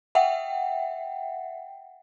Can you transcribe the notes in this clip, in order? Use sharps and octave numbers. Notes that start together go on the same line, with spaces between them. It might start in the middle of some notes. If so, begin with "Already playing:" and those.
E5 F#5 G5